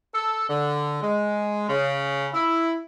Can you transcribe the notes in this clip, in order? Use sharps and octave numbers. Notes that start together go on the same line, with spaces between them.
A4
D3
G#3
C#3
E4